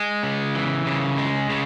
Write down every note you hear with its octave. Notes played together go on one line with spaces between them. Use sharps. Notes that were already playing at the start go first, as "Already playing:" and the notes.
Already playing: G#3
C#3
E3
C#3
G#3
C#3